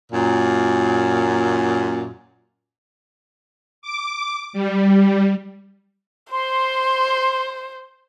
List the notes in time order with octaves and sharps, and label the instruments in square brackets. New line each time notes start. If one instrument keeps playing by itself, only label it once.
[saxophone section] F#2 A#2
[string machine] D6
G3
[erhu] C5 [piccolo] C6